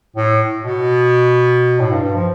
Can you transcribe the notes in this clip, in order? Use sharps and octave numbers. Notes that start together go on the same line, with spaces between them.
A2
B2
A2
G2
G2
F3